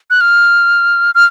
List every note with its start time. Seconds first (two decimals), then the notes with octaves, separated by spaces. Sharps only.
0.10 F#6
0.21 F6
1.15 F6